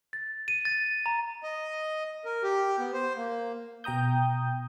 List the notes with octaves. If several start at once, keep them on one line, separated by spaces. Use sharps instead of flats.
A6
D#7
A6
A#5
D#5
A#4
G4
B3
C5
A#3
B2 G5 A#5 D#6 G6